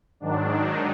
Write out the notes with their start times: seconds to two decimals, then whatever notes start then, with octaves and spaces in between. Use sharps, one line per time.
0.20 G#2 D#3 F#3 D4
0.50 D#4